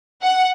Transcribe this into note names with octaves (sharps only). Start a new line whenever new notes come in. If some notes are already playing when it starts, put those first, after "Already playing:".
F#5